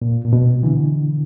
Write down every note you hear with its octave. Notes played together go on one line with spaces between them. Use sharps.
A#2
A#2
B2
D3 E3